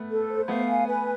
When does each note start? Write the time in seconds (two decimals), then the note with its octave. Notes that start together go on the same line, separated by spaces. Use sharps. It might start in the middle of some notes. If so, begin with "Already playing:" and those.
Already playing: A3 B3
0.11 A4
0.30 C5
0.48 A3 B3 F5
0.68 G#5
0.87 B4